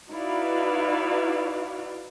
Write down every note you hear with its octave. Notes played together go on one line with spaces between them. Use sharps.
D#4 E4 F#4 B4 D5 F5